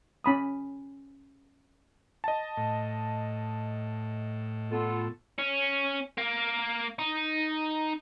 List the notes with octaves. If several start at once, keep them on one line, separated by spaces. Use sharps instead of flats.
C#4 B5 D#6
D#5 A5
A2
B3 F4 A4
C#4
A#3
D#4